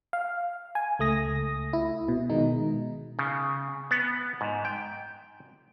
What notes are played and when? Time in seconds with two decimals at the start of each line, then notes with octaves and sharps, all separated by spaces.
0.13 F5
0.75 G#5
0.99 C#2 A3 D#6 A#6
1.73 E4
2.08 B2
2.29 B2 D#3 G#3 D#4
3.19 C#3
3.91 B3
4.41 G#2
4.65 G5